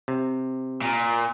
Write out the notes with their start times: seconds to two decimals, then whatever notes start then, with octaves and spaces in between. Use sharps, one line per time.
0.08 C3
0.82 A#2